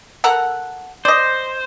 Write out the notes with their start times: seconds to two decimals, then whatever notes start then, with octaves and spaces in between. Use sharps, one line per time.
0.24 A4 A#4 F#5
1.05 C5 D5 D#5